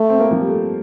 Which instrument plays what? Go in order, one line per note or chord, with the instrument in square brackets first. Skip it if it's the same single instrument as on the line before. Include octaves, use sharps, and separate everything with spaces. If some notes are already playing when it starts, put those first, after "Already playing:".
Already playing: [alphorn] A3
[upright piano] C4
A#3
F3
G3
A3